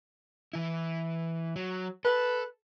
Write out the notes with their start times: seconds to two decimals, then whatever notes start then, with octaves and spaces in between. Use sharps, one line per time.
0.53 E3 E4
1.56 F#3
2.05 A4 B4